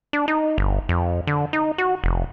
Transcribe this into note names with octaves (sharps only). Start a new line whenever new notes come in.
D4
D#4
G1
F2
D3
D#4
F#4
F1